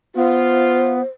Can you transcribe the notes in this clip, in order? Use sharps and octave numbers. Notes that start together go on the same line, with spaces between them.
B3 F4 C5